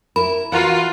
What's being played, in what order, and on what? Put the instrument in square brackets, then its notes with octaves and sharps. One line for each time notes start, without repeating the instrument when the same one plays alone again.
[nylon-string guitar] E4 A#4 [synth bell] B5
[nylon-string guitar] E3 [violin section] F4 [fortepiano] F#4 A#4 F#5